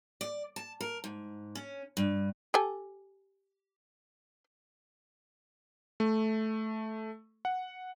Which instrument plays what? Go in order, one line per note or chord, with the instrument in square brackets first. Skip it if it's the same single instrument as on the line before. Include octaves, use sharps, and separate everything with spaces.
[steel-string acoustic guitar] D5
A5
A#4
G#2
C#4
G2
[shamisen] G4 A4 G#5
[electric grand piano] A3
F#5